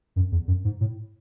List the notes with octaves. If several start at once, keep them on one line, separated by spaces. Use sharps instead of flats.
F#2
E2
F#2
G#2
A2